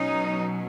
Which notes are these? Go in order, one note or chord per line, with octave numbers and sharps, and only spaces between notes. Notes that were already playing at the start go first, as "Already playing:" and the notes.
Already playing: B2 F#3 C#4 D#4